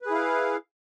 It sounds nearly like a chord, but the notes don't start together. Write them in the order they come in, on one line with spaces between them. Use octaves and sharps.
B4 G#4 E4 F5